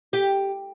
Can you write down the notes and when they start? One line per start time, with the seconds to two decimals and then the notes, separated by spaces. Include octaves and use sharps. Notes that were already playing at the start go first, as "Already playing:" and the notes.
0.13 G4